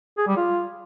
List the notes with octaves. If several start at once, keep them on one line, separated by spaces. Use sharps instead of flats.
G#4
G3
F4